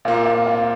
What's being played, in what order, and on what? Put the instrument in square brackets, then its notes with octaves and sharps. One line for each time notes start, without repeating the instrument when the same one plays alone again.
[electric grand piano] A#2 A#3 F4 [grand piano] F5
[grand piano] F5
F5